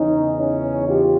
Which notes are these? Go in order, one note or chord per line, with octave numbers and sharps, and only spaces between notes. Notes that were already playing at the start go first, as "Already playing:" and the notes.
Already playing: E2 C#3 E3 C#4 D#4
C#4 D#4
F4 G4